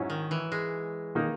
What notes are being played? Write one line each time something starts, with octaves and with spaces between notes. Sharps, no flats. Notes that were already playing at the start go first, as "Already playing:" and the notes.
Already playing: G#2 F#3 C#4 E4
D#3
E3
G#3
D#3 A#3 D#4